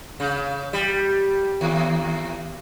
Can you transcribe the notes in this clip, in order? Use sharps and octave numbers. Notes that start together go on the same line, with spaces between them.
C#3
G3
D#2